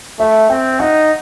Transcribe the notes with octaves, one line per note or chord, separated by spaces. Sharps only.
A3 E5
C4 G5
D#4 F#5